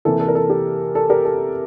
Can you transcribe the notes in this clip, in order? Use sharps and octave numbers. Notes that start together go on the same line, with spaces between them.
C3 E3 A#3 A4
A4
A#4
A4
G4
A4
G4 A#4
A4